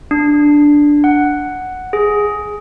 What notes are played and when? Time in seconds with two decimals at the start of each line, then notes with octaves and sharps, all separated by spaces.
0.11 D4
1.04 F#5
1.93 G#4